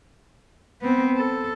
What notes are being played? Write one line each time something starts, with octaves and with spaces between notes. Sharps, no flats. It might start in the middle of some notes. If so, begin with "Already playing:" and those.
B3 C4
A4